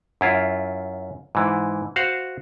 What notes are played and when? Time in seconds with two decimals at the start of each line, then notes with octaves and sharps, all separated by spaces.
0.21 F#2 E4 F4
1.35 G#2 E3
1.96 F#4 C5 F5 F#5